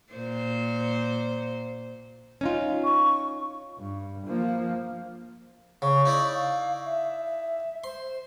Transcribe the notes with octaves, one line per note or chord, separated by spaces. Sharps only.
A#2 C5
C#4 D#4 F4
C#6
G2
F3 A#3
C#3 C#6
D#4 E4 D5
F5
E5
E5
C5 C6